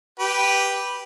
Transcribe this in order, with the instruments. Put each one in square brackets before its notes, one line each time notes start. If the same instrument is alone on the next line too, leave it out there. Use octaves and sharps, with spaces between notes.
[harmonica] G4 B4